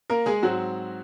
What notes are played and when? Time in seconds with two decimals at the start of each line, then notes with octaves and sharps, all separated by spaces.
0.10 A#3 A#4
0.26 G#3 G#4
0.42 G#2 F#3 C4 F#4